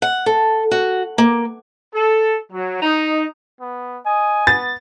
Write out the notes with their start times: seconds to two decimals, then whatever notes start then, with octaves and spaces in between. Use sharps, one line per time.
0.02 F#5
0.26 A4
0.71 F#4
1.18 A#3
1.95 A4
2.52 F#3
2.82 D#4
3.60 B3
4.06 D#5 G#5
4.47 B3 A6